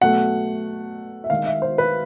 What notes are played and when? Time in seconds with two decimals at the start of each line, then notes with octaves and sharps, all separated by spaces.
0.01 B2 F#3 A3 F#5
1.24 E5
1.30 D#3 G#3 F5
1.46 E5
1.62 C5
1.78 B4